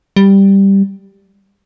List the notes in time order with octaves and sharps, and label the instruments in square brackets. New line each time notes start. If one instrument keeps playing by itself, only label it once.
[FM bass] G3